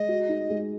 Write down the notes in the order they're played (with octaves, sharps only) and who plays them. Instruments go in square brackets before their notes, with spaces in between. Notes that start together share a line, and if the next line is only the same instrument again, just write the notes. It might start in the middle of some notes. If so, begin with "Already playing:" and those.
Already playing: [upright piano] G#3 [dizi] D#5
[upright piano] F#4
D#4
G#3